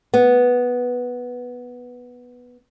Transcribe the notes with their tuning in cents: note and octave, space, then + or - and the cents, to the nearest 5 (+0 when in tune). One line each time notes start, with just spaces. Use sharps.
B3 -5